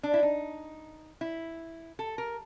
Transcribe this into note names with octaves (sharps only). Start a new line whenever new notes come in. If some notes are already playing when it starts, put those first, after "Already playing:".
D4
E4
D#4
E4
A4
A#4